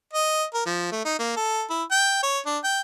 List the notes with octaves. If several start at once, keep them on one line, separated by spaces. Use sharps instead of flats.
D#5
A#4
F3
A3
D#4
A#3
A4
E4
G5
C#5
D4
G5